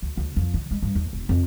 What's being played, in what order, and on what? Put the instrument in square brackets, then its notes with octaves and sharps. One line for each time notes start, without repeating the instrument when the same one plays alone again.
[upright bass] D2
D2
F2
D3
G#3
G2
D#2
E1
F2